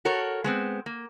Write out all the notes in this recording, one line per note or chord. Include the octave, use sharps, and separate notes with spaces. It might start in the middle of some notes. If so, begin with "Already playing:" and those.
F#4 A4 A#4 C#5
G#3 B3 C4
A#3